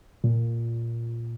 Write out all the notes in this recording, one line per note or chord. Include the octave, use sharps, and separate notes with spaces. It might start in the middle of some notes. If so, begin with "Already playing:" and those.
A#2